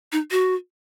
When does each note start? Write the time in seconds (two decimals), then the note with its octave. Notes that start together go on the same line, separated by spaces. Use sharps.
0.12 D#4
0.31 F#4